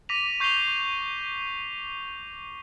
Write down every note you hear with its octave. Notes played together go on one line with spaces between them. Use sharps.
D6 A#6 B6 D#7 F7
C#6 G6 C7 D#7 F7 G7